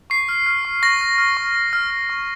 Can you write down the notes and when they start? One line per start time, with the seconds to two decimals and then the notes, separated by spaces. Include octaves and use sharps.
0.10 C#6 C7
0.29 F6
0.47 F6
0.65 C#6
0.82 C#6 A#6
1.01 F6
1.18 F6
1.37 C#6
1.55 C#6
1.73 F6
1.90 F6
2.10 C#6